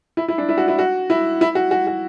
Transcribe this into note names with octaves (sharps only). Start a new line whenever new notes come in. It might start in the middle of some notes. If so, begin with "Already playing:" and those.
E4
E4
D4
E4
F#4
E4
F#4
E4
E4
F#4
F#4
F#4